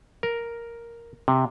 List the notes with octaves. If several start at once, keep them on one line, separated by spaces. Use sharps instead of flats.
A#4
C3